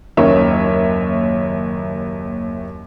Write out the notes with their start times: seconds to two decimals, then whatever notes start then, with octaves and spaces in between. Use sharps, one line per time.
0.17 F#1 D#2 C#4 A#4 C#5 E5